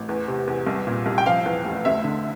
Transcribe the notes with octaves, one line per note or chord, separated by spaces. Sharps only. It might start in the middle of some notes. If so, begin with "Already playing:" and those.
Already playing: A1
E2
C3
E2
C2
A#2
C2
G5
F3 F5
E2
F1
D2 E5
D3